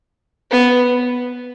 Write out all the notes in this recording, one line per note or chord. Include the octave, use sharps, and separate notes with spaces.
B3